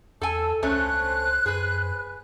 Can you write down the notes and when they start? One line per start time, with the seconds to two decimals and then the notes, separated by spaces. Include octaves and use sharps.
0.22 E2 A4 G#5 A5 E6
0.63 C#2 G2 A3 C#4 C5 F#6
1.46 F#2 G#4 B4